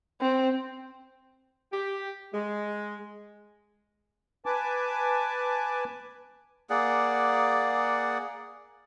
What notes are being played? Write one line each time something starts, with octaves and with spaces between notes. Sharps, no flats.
C4
G4
G#3
B4 G#5 A5 D6
A#3 G#4 D5 F#5